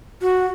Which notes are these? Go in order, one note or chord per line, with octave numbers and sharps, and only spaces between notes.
F#4